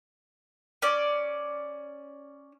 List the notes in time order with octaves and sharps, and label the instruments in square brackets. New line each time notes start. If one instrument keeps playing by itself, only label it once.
[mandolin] C#4 D5